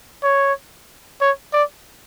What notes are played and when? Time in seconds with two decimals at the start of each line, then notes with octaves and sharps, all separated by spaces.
0.23 C#5
1.21 C#5
1.53 D5